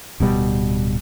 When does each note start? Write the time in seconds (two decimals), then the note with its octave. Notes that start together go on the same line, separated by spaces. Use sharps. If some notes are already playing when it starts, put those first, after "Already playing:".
0.20 D1 B2 G3